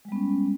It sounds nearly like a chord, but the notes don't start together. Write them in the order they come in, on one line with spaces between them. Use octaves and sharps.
G#3 G3 B3 C#4